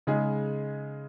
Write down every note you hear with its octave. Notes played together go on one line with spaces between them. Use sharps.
C#3 G#3 D#4 G#4